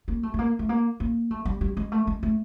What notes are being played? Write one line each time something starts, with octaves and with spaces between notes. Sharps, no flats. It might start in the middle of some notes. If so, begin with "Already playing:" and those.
A#3
A3
A3
A#3
A3
A#3
A#3
A3
G3
G3
G#3
A3
G#3
A3